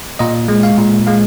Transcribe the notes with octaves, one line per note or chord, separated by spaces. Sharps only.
A#2 D#5
G#3
F5
A#2
G#3 F5